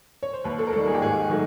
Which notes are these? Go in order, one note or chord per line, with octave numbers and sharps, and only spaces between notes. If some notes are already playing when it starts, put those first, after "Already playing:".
C#5
C5
D#2 B4
A4
A#4
D#3 G3 A#3 A4
G#4
G4
G#2 G#4
D#3 F#3 A3